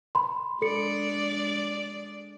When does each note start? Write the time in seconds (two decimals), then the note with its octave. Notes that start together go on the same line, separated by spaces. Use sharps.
0.15 B5 C6
0.62 G#3 D4 A4 D5 C#7